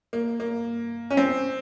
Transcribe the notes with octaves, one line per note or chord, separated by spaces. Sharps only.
A#3
A#3
C#4
C4